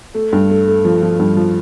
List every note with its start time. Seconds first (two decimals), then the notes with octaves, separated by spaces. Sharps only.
0.15 A3
0.33 G2
0.50 A3
0.68 A3
0.85 F3
1.03 F3
1.19 G2
1.37 F3